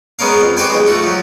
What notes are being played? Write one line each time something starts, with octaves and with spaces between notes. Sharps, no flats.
G#3 B3 C#4 A#4 F5
F2
F#4 G4 B4 C5 G5 G#5
B1 G#3
A3 F4 F#4
F3 F#3